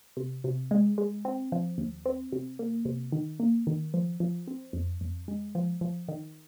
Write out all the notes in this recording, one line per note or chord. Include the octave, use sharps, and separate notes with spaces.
C3
C3
G#3
G#3
C4
F3
D#2
C4
C3
A#3
C3
D#3
A#3
D#3
F3
F3
C4
F2
F2
G#3
F3
F3
D#3